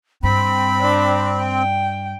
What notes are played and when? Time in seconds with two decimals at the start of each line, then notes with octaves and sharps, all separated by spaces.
0.23 G2 C4 B5
0.80 D4
1.39 G5